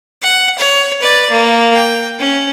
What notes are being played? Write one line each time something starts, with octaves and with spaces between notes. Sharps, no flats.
F#5
C#5
B4 D5
A#3
G5
C#4